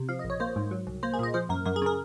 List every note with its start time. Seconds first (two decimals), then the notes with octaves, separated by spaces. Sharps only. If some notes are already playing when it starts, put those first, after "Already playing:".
Already playing: C3
0.09 F3 F5
0.19 D#5
0.24 A#1
0.30 C#5
0.40 A#3 C5
0.56 G#2
0.71 F#3
0.87 C2
1.03 A#3 C5
1.14 G#4
1.19 A#2 D#5
1.34 F3 C5
1.49 F#2 A#4
1.66 F#2 A#4
1.76 G#4
1.82 C#3 A#4